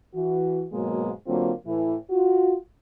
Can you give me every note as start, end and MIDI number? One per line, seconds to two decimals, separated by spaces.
0.14 0.65 52
0.14 0.65 66
0.73 1.10 44
0.73 1.10 47
0.73 1.10 54
0.73 1.10 56
0.73 1.10 58
1.27 1.51 50
1.27 1.51 54
1.27 1.51 58
1.27 1.51 60
1.27 1.51 65
1.66 1.95 45
1.66 1.95 52
2.10 2.55 65
2.10 2.55 66